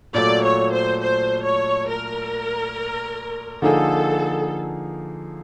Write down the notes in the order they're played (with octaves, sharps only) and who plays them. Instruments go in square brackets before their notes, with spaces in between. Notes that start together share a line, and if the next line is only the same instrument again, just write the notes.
[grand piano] A#2 F#3 A3 [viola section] D5
[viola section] C#5
C5
C5
C#5
A#4
[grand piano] D3 F3 A#3 D#4 G#4 [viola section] A4